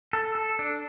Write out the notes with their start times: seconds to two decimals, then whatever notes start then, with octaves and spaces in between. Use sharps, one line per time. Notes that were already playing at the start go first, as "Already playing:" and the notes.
0.13 A4
0.35 A4
0.59 D4